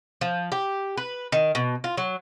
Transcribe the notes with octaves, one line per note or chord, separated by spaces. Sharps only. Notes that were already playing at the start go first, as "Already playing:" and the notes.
F3
G4
B4
D#3
B2
F4
F#3